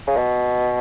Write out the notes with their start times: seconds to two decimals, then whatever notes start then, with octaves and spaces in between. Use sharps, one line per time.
0.07 C#3
0.17 B2